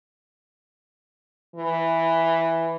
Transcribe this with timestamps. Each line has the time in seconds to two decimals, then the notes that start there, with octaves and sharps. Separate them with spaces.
1.56 E3